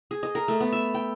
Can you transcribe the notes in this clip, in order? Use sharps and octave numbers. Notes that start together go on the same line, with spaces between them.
G#4
D#5
A#4
A3
B3
E5
G5